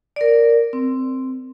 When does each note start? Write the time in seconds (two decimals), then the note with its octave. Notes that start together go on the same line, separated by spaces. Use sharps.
0.16 A#4 D5
0.73 C4